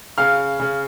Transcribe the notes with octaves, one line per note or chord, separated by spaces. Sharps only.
C#3 F5 F6
C#3